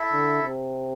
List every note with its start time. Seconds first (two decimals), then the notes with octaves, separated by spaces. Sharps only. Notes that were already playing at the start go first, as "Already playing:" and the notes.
Already playing: E4 A4 E5
0.13 D3
0.42 C3